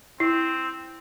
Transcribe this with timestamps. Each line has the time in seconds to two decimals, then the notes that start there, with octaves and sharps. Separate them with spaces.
0.20 C4 E4